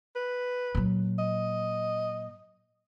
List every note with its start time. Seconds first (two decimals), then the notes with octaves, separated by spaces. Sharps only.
0.16 B4
0.75 A#2 F#3
1.19 D#5